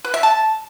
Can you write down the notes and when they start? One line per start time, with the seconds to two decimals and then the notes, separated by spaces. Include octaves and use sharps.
0.05 B4
0.14 E5
0.23 A5